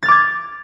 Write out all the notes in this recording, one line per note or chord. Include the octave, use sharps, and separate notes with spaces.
D6 F6 G#6 A6